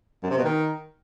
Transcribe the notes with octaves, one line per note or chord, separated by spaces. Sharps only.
F#2
C3
B2
D#3